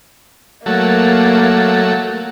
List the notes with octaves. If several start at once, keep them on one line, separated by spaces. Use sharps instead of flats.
F#3 A3 A#3